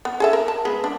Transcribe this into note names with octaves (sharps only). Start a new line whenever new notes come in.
B3
G#4 A4 E5
A#4
A5
G#3 B3 G#4
D4